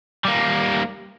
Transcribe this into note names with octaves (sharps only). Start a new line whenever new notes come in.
G3 A#3